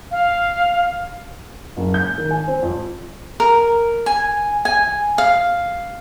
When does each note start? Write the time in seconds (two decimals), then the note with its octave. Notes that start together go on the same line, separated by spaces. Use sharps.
0.11 F5
1.77 F#1
1.94 G6
2.18 D#3
2.31 G#5
2.48 C4
2.62 F2
3.40 A#4
4.06 G#5
4.65 G#5
5.18 F5